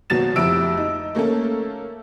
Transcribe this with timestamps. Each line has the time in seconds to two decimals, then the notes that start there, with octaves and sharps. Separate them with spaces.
0.10 G#1 B2 F#3 A6 E7
0.36 F1 F2 E4 E6 D7
0.77 D#4
1.15 A3 A#3 C#4 A4